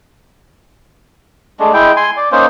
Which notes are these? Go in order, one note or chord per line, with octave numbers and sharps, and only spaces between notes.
G#3 A3 D4
G#3 E4 G5
G#5 C6
D5
A#3 C#4 D#4 C5